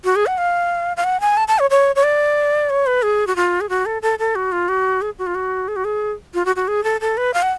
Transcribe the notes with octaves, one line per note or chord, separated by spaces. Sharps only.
F#4
G#4
F#5
F5
F5
F#5
G#5
A5
A5
C#5
C#5
C#5
D5
C#5
B4
G#4
F#4
F4
G#4
F#4
A4
A4
A4
F#4
F4
F#4
G#4
F#4
F4
F#4
G#4
F#4
G#4
F4
F#4
F#4
G#4
A4
A4
B4
F5
F#5